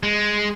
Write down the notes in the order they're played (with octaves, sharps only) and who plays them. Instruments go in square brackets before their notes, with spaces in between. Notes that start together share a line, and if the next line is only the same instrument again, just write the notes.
[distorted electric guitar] G#3